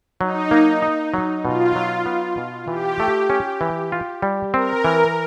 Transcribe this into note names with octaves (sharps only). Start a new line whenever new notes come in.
F#3 D#4
A#3
D#4
F#3
B2 F4
F#3
B3
B2
E3 G4
A3
C#4
E3
F4
G3
C4 A#4
E3